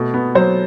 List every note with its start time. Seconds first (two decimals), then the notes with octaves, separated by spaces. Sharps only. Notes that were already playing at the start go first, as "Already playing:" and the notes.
Already playing: B2 A3
0.14 B3
0.35 F#3 C5